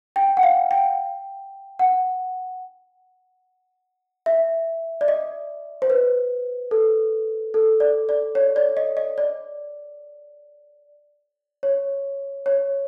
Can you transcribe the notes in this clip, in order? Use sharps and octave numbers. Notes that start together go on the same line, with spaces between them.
G5
F#5
F5
G5
F#5
E5
D5
D#5
C5
B4
A4
A4
D5
D5
C#5
D5
D#5
D#5
D5
C#5
C#5